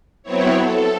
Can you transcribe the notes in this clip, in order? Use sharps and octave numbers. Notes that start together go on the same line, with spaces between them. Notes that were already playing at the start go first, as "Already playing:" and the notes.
F#3 B3 C4 E4 C#5
A4